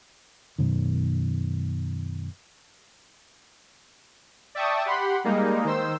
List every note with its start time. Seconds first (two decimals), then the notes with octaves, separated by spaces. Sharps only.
0.59 F#2 B2 D#3
4.55 D5 E5 G5 A5 C#6 D#6
4.86 G4 F#5 B5 C6
5.24 G3 G#3 A#3 D#4
5.64 D#3 C5 E6